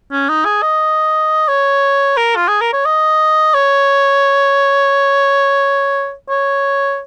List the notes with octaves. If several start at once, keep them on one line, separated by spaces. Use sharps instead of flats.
C#4
D#4
G#4
D#5
C#5
A#4
F4
G#4
A#4
C#5
D#5
C#5
C#5